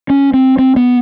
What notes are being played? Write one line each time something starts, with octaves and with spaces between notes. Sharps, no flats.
C#4
C4
C4
B3